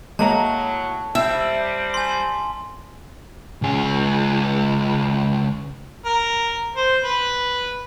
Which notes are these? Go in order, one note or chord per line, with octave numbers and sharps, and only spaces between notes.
A2 F#3 G#3 A#3 A5 A#5
G3 C4 E5
G#5 C6
C#2 G#4
A#4
C5
B4